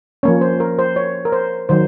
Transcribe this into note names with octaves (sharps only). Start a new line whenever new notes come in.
F3 A#3 C#4 C#5
C5
A#4
C5
C#5
A#4
C5
D#3 F#3 C5